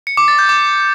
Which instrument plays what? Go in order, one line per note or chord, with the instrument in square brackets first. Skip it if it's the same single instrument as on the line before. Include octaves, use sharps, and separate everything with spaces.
[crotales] C#7
D6
A6
G6
D6